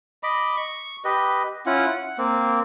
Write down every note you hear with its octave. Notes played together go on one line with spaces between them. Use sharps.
D#5 B5 D6
C#6
G4 B4 D#5
C#4 E4 F4 F#5
F#5
A#3 C4